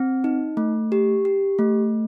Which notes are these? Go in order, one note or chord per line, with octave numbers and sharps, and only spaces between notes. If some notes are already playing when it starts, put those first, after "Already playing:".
Already playing: C4
D#4
A3
G4
G4
A3